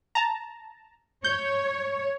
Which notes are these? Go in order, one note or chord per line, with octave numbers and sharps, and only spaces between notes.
A5 A#5
C#5 G6